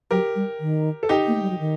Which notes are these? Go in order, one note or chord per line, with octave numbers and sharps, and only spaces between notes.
F#3 G4 A#4
G3
D#3
A4
D#4 G4
A#3
A3
G3
F#3
D#3